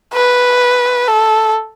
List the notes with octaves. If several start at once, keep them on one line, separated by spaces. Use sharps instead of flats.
B4
A4